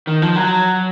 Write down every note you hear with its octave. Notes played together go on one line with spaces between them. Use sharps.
D#3
F3
F#3